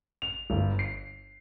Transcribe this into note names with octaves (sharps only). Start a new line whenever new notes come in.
F7
G1
C7